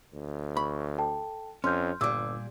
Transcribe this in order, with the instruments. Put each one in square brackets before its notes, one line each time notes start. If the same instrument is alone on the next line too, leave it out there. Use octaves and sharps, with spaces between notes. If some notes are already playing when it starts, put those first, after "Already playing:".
[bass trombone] D2
[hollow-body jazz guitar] B5 [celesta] C#6
[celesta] A4 G5 A5
[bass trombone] F2 [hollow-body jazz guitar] C#4 [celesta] C6 F6 G6
[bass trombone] G1 [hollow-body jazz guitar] A#2 G3 [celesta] D6 E6